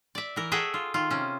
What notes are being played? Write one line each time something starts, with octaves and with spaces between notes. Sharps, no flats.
D5 E5
E3 A#4
F#4 G#4 A4 E5 F#5 G5
F4
D#3 F4
C3 C#4